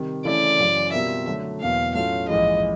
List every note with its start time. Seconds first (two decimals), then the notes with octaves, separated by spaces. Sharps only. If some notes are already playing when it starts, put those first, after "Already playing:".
Already playing: C3 D#3 G3
0.25 C#3 E3 A3 C#4 E4 D5
0.59 F#2 C#3 E3
0.92 B2 G3 C4 F4 A#4 E5
1.27 D3 F#3 A3
1.61 E2 B2 F#3 A#3 F5
1.94 A2 F#3 A3 C#4 F4 F5
2.28 A#1 G#2 E3 G#3 D#5